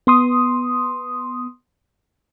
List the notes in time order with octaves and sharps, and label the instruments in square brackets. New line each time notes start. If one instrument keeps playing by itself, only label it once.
[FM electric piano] B3 C6 D#6